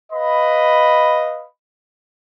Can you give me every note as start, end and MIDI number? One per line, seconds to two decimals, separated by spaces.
0.12 1.46 71
0.12 1.46 75
0.12 1.46 77
0.12 1.46 83